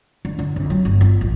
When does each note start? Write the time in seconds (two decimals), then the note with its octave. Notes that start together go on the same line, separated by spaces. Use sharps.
0.25 D3
0.39 D3
0.56 F2
0.70 F#3
0.85 G1
1.01 F4
1.21 A1